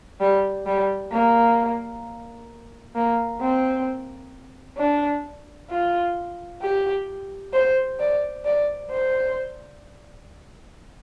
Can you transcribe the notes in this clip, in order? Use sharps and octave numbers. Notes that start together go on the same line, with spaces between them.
G3
G3
A#3
A#3
C4
D4
F4
G4
C5
D5
D5
C5